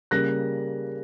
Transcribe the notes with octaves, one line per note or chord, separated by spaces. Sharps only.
C#3 G3 A#3 F#6 A#6